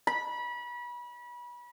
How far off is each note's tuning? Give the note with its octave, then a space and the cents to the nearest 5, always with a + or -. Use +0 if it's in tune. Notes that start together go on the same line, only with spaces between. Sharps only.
B5 -30